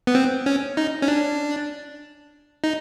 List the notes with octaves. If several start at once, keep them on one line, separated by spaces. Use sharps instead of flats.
B3
C4
C#4
D#4
C#4
D4
D#4